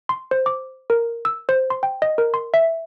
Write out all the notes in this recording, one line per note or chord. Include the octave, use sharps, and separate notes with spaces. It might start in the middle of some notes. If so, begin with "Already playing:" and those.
C6
C5
D6
A#4
E6
C5
C6
G5
D#5
A#4
C6
E5